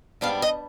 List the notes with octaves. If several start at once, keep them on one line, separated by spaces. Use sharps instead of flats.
G#2 G3 B3 D4 F5
D#5